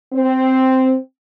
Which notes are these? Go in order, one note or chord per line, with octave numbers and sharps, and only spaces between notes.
C4